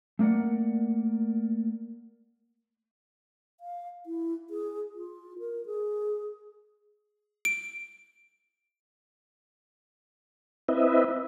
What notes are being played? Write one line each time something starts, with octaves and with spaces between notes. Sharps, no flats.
A3 A#3 A#4 D5 F#5
F5
E4
G#4
F4
A#4
G#4
D7
C4 E4 B4 D#5 E5